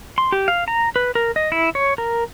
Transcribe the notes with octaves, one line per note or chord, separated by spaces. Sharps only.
C6
G4
F5
A#5
B4
A#4
D#5
E4
C#5
A#4